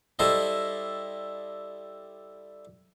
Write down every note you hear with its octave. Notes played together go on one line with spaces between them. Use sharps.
G3 E4 A4 C5 D#5